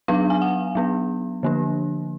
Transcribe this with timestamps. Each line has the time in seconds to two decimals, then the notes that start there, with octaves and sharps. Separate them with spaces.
0.08 F#3 B3 D4 F5
0.30 G#5
0.42 F#5
0.75 F#3 B3 D4
1.43 D3 F3 A#3 D4